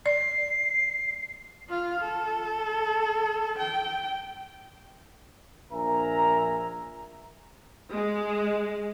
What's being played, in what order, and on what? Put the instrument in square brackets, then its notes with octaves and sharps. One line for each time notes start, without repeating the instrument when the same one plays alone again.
[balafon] D5 [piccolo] C7
[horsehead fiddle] F4 F5
A4
G5
[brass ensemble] A#1 A#4 E5 G#5 A#5
[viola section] G#3